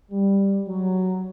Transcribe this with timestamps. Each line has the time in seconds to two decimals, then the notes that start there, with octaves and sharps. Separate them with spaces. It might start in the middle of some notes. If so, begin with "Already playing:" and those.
0.11 G3
0.67 F#3